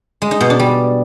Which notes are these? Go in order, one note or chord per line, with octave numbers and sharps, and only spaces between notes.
G#3
D#4
B2
D4
G3